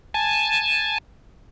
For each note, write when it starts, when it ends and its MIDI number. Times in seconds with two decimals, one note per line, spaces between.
0.14 0.98 80
0.14 0.98 81